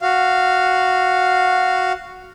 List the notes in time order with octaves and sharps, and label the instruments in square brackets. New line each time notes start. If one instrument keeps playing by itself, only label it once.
[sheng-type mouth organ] F#4 F5